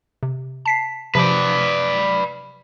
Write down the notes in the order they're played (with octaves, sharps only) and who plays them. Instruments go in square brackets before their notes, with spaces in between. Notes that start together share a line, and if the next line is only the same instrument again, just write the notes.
[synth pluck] C3
A5 B6 C7
[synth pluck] C3 F3 G4 [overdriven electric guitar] B4 D5